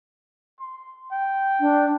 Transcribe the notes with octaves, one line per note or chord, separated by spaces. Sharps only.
C6
G5
D4